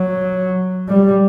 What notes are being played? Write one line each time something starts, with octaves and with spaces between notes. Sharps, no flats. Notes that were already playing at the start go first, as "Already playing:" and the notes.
Already playing: F#3
G3